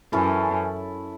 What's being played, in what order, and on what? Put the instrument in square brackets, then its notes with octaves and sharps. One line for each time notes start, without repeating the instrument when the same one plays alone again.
[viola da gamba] F#2 [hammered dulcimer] E3 C#4 E4 A4